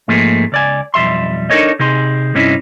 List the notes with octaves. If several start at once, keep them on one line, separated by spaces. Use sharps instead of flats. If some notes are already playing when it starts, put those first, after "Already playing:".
G#2 F3 A3 A#3 G#4
C#2 D5 G#5
B1 F2 G3 E5 C6
D4 D#4 A4 A#4 C#5 D#5
C3 D#4 G4 G#4 C6
G2 C3 C#4 D#4 E4